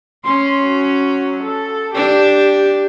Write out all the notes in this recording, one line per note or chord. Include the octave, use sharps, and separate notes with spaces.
C#4 C6
F#3
A4
D4 G4